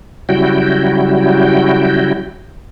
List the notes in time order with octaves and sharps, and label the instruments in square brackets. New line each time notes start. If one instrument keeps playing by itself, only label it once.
[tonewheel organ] C#3 F#3 G3 E4 F#4 G5